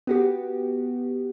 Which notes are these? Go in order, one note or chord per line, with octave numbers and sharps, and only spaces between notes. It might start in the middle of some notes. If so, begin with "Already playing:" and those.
B3 F#4 G4